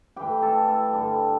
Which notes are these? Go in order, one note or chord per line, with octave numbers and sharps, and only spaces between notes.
A2 E3 G3 G4 G5
A4 A5
A4 A5
G2 D3 G3